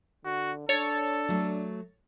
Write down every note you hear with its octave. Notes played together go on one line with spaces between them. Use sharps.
D3 F#4
D4 A4 C#5 A6
F#3 A3